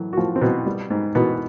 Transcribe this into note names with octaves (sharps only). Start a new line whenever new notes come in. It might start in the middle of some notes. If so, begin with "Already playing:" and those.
Already playing: A2 E3 F#3
F#4
A2 F3 F4
C4
B2 E3 B3
G3
G#2
B2 E3 B3